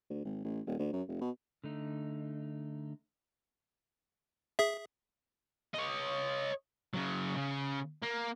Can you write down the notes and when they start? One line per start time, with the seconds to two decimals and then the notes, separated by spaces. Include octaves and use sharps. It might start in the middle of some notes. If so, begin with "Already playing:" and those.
0.10 D2
0.25 G#1
0.44 A1
0.67 D#1
0.79 D2
0.92 F#2
1.08 F1
1.21 B2
1.64 D3 A3 D#4
4.59 G#4 E5
5.74 C#5 D#5
6.94 C#3 F#3
7.36 C#3
8.03 A#3